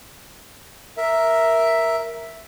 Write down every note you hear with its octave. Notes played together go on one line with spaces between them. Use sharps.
A#4 E5